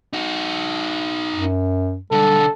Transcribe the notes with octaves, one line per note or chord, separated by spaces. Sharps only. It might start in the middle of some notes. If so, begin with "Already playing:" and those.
D#4 F#4
F#2
B1 D3 G3 A4